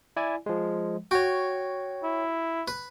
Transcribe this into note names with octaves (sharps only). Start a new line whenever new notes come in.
E4 D5 G#5
F3 G#3
F#4 C#5 G5
E4
B4